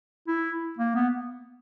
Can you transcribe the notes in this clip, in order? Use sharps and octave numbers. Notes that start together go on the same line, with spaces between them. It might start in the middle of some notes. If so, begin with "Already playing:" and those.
E4
A#3
B3